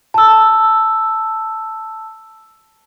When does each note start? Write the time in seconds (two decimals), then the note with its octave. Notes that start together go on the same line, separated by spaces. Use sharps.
0.14 A5 E6